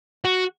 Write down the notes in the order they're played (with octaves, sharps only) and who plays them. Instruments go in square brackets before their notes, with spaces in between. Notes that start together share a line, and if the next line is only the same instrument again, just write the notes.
[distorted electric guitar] F#4